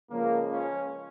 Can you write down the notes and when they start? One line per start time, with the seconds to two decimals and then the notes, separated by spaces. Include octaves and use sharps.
0.10 C#2 C#3 F3 A#3
0.52 C#4